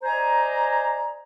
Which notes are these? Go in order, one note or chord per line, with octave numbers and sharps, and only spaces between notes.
C5 D5 D#5 G#5 A#5